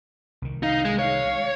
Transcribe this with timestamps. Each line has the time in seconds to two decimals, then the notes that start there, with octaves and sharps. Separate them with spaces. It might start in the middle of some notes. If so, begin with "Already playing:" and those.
0.42 C2 D#3
0.63 D#4 F5
0.85 G#3
0.99 C#5 F5